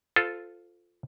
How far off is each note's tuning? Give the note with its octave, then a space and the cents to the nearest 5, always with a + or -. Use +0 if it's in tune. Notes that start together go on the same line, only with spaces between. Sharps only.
F4 +0 A4 +0 C5 -20